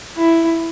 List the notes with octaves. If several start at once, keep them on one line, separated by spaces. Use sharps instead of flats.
E4